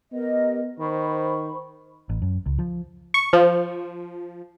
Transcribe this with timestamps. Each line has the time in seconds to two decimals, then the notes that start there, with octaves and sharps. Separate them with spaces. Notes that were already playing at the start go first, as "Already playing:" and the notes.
0.12 B3 G4 A#4 D#5
0.79 D#3 C5 B5 C#6
2.09 A1
2.22 F#2
2.46 C#2
2.59 F3
3.14 C#6
3.33 F3